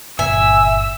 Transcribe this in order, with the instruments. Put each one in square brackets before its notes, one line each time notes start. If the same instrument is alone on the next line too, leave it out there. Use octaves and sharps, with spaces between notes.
[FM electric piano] G1 A#2 [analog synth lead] E5 [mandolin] G#5 [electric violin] E6